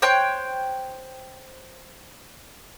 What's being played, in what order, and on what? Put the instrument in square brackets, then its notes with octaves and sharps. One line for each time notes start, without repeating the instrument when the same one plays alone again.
[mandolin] C5 C#5 G5 F#6